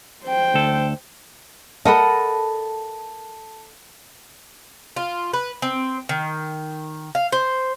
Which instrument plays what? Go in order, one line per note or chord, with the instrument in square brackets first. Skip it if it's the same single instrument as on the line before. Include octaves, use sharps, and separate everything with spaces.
[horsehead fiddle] C5 G5
[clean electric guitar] D2 A4
[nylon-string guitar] A4 D#5 [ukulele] A#4 F#5 B5 [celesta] A5
[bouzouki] F4
B4
C4
D#3
F5
C5